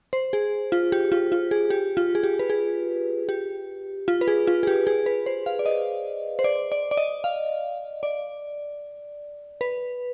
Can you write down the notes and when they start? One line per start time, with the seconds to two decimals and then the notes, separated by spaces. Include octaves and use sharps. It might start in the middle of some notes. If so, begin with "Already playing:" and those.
0.13 C5
0.33 G#4
0.72 F4
0.92 G4
1.12 F4
1.32 F4
1.51 G#4
1.70 G4
1.97 F4
2.15 G#4
2.23 G4
2.39 B4
2.50 G#4
3.29 G4
4.08 F4
4.21 B4
4.28 G#4
4.47 F4
4.63 G#4
4.67 G4
4.87 G#4
5.06 B4
5.26 C5
5.46 F5
5.59 D5
5.66 D#5
6.39 C5
6.44 D5
6.72 D5
6.91 D5
6.97 D#5
7.24 F5
8.03 D5
9.61 B4